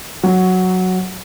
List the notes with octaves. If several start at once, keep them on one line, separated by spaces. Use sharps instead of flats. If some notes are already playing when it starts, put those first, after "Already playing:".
F#3